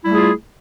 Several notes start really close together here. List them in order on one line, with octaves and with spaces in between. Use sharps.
E4 G3 A3 G#4 F4